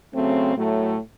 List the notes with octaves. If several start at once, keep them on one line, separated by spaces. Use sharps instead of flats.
C#3 F#3 A3 C4
A2 F#3 A3